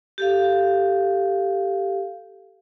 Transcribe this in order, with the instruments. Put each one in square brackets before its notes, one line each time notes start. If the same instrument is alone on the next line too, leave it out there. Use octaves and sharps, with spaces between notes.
[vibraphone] G4 A4 F5